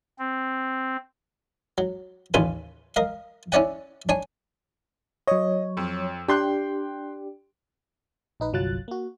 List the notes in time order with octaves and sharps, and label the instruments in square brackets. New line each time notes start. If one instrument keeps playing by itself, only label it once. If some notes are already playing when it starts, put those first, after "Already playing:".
[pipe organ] C4
[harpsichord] F#3
A1 D#2 C#3 F4 B4 G#5
A#4 D#5 F5
C#4 E4 C#5 D5 F#5 G5
D4 C#5 G#5
[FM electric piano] F#3 C#5 [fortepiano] D#5
[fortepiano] F2
[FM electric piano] D4 G4 [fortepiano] G5 C6 F#6
[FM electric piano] A#1 D#4 B4
G1 C2 F#3 F4 F#6 A6
A#3 F#4